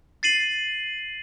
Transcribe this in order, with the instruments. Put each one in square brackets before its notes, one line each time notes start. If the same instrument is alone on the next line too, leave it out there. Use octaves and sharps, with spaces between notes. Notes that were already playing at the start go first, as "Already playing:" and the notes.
[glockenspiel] A6 C7 D#7 F#7